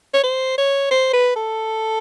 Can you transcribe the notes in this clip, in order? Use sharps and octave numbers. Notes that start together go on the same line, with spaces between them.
C#5
C5
C#5
C5
B4
A4